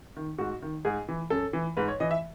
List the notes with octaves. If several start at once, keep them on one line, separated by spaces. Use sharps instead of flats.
D#3
G#2 F#4
D#3
G#2 G#4
E3
F#2 A4
E3
G#2 B4
C#5
E3 D#5
E5